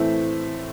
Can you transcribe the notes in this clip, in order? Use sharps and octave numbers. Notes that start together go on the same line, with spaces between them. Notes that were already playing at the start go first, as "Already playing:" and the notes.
Already playing: A2 E3 A3 C4 E5